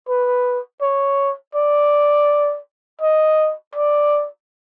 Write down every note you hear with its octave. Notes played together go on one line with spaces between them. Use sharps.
B4
C#5
D5
D#5
D5